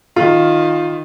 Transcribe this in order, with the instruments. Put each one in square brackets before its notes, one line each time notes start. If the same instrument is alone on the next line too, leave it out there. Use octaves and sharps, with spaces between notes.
[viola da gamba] D#3 [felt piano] F4